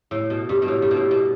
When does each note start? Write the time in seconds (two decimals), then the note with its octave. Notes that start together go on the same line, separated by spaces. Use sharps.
0.11 A2
0.30 B2
0.49 G2
0.62 B2
0.68 A2
0.82 G2
0.91 B2
0.97 A2
1.11 B2